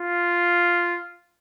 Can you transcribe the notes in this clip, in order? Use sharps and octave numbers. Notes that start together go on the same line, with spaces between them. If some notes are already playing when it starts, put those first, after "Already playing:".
Already playing: F4